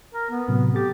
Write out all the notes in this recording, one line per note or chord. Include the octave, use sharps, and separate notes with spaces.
A#4
B3
A2 C3 F#3
G4 A4 A6